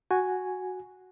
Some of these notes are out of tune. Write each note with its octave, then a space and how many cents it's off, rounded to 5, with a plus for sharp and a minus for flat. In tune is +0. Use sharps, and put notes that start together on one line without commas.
F#4 +0 G#5 +0